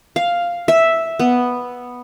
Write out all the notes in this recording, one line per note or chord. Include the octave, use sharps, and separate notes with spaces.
F5
E5
B3